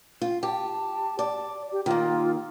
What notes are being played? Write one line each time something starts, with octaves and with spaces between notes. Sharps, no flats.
F4
G4 A5
D5
G4
D#3 A#3 F4